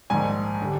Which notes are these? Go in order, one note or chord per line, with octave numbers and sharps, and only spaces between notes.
A#1 G#2 D#3 G#5
D3 G3